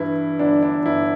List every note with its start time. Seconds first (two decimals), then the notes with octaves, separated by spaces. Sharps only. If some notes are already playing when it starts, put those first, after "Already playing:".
Already playing: G2 E3 E4
0.39 G1 D4
0.63 D4
0.85 G1 E4